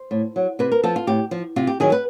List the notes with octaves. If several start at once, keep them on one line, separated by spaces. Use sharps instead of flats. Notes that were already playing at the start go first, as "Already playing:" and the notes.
Already playing: C5
A2
F#3
C3 B4
A#4
F3 A4
F4
A2 G4
F3
C3 F4
G4
D#3 F#3 G#4
B4